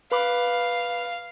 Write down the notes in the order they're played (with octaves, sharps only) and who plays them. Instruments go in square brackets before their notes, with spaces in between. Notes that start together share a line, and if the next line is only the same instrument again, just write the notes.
[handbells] B4 B5 D6 [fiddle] F5